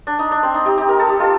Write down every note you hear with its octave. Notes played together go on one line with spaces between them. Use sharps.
D4
D#4
D4
C4
D#4
D#4 G4
D#4 G4
A#4
A4
G4
F4 A4